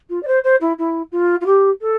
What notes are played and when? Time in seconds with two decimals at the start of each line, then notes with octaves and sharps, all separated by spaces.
0.10 F4
0.23 D5
0.28 C5
0.44 C5
0.61 E4
0.79 E4
1.12 F4
1.41 F4
1.46 G4
1.81 A4